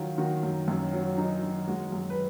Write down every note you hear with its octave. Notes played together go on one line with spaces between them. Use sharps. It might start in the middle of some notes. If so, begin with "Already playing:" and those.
Already playing: D#3 F#3 F4
D#3 F#4
F#2
F#2 C#4
F#3
F#3 D#4
D#3
G#3 F#4
F#2
B4